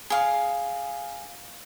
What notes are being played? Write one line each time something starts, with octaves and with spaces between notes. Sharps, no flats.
G#4 F5